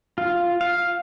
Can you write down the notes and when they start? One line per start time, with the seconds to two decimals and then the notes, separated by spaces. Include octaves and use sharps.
0.18 F4
0.61 F5